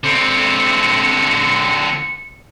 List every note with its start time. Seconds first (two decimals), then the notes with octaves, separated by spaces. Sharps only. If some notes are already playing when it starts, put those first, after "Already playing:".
0.04 D3 C4 C#7